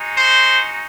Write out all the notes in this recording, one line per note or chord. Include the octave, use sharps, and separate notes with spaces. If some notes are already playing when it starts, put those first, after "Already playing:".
Already playing: G#3 D#4 F#4
C5